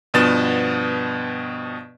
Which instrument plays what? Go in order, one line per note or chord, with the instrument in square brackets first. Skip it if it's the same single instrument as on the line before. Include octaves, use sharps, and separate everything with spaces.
[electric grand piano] G2 B2 F3 B3 A6 E7